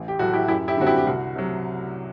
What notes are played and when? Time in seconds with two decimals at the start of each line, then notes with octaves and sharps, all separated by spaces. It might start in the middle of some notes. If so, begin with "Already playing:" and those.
Already playing: A1
0.08 G4
0.19 A2 F#3 F#4
0.33 E4 G4
0.48 F#2 E4 G4
0.68 E4 G4
0.77 D3 G3 C4 F#4
0.87 E4 G4
0.98 G4
1.07 C2 F#4
1.36 C3 F#3